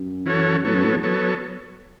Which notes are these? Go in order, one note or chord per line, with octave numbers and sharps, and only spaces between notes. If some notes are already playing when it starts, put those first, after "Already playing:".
Already playing: F#2
E3 C#4 F#4 A4 C#5
A2 F#3 B3 A4 C#5
F#2
A2
E2
F#3 B3 A4 C#5